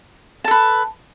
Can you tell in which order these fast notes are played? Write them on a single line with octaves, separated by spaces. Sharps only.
A5 A4 B4